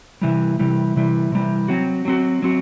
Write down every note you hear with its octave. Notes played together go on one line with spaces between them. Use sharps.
C3 E3 G3
C3 E3 G3
C3 E3 G3
C3 E3 G3
F#3 C4 F#4
F#3 C4 F#4
F#3 C4 F#4